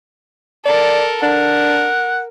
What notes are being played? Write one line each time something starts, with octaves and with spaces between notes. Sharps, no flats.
A4 A#4 D5
D4 A#4 F#5